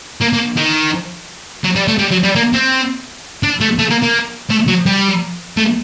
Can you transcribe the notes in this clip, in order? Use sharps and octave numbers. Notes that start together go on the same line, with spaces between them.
A#3
A#3
D#3
F#3
G3
A3
G3
F#3
G3
A#3
C4
D4
A3
A3
A#3
A#3
A3
F#3
G3
A3